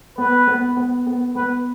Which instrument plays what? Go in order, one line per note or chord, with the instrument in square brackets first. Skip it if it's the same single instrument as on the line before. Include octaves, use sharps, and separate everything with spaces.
[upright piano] B3 [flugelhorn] B4
[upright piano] B3
B3
B3
[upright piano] B3 [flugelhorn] B4